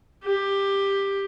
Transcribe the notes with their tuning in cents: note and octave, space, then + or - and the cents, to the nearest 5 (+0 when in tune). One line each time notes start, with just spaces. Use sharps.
G4 +10